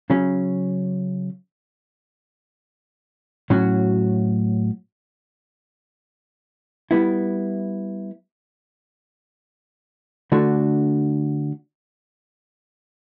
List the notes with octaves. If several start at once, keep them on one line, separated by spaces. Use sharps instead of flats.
C#3 F#3 C#4
A2 F#3 C#4 F#4
G3 B3 E4
D3 A3 D4 F#4